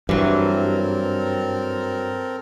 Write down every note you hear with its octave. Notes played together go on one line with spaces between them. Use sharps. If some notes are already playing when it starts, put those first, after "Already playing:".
G2 E3 F#3 C4 A4 A#4